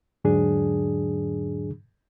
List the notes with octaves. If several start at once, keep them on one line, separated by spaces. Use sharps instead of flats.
E2 G#2 D3 F#3 D4 G#4